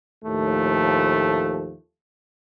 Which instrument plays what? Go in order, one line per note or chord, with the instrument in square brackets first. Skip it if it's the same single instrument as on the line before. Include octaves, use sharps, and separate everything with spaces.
[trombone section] D#2 A2 F3 A3